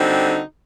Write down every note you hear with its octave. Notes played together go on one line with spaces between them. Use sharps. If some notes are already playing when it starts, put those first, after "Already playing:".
Already playing: D3 G3 C4 D#4 F#4